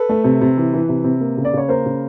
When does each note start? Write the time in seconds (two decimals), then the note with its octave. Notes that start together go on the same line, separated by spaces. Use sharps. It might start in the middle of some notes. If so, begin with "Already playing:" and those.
Already playing: A4 B4
0.09 A3
0.24 C3
0.41 C3
0.57 E3
0.73 E3
0.89 C3
1.04 C3
1.21 A#3
1.38 C#3
1.45 D5
1.53 C#3 C#5
1.69 A#3 A#4 C5
1.86 C#3